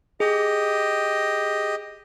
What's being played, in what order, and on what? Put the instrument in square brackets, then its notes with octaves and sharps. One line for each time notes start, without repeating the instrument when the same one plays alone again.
[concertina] G4 D#5 [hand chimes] G#4